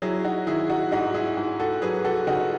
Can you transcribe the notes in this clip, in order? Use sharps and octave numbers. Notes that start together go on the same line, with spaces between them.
F#3 E4 G#4
D#4 F#4
D#3 E4 G#4
D#4 F#4
G#2 D#4 F#4
E4 G#4
G#2
F#4 A4
F#3 G#4 B4
F#4 A4
C#3 D#4 F#4